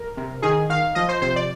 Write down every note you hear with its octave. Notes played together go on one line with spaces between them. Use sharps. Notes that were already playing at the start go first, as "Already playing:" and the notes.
Already playing: A#4
C3
D#3 G#4
D#3 F5
F3 D#5
C5
C3 C5
D5